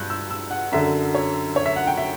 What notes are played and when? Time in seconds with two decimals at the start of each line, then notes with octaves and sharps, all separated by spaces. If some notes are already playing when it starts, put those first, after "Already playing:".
Already playing: G2 F#6 G6
0.10 E6
0.30 E6
0.51 F#5
0.72 F#2 D3 F#3 E5
1.15 C#5
1.56 C#5
1.66 E5
1.76 F#5
1.87 G5
1.97 E5